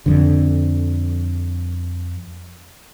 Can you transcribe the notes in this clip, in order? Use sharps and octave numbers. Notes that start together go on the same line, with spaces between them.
F2 D3